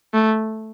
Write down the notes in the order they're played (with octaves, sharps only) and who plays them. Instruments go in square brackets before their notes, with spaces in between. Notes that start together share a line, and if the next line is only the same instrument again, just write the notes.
[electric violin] A3